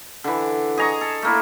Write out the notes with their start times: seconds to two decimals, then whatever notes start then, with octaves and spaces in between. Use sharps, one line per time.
0.24 D3 E3
0.77 G#4 D#5 A#5 C#6
1.01 A4
1.22 A3 A#3 E4